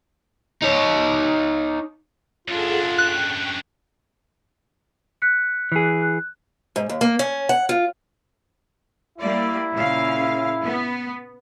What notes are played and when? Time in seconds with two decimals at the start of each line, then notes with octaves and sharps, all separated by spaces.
0.62 D#4 C#5
2.48 F#2 D4 F4 G#4 A4 F#5
2.98 G5 C#6 F#6
5.22 F#6 B6 C#7
5.72 E3 G#4
6.02 F#6
6.76 G#2
6.89 D#2
7.01 A#3
7.19 C#4
7.49 F#5
7.69 F4
9.18 G3 A#3 E4 D5
9.74 A#2 C#3 F5
10.64 B3